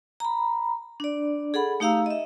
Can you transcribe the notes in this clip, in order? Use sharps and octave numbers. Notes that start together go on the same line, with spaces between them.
A#5 B5
D4 D5
G#4 A4 F#5 B5
A3 D#4 G4 F5 A#5 E6
D#5 E5